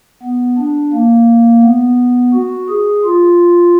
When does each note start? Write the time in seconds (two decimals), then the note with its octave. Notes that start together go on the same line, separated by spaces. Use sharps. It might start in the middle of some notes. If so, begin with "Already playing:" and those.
0.23 B3
0.58 D4
0.93 A#3
1.63 B3
2.34 F#4
2.69 G#4
3.04 F4